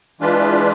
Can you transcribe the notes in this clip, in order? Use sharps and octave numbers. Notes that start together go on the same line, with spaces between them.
E3 G#3 D4 F4 B4